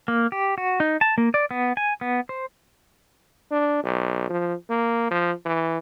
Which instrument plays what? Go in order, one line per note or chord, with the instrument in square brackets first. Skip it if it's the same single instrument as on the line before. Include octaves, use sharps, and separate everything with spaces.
[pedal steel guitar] A#3
G4
F#4
D#4
A5
A#3
D5
B3
G#5
B3
C5
[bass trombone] D4
B1
F3
A#3
F3
E3